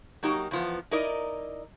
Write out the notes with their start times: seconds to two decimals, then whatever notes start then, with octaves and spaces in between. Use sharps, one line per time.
0.23 F#3 A#3 D#4 F#4 G4
0.51 E2 F3 B3
0.91 D#4 E4 A#4 D5 D#5